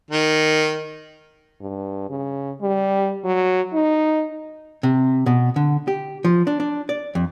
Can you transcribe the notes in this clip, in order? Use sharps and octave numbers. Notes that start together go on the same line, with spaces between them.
D#3
G2
C#3
G3
F#3
D#4
C3
B2
D3
G4
F3
D4
D4
D5
F2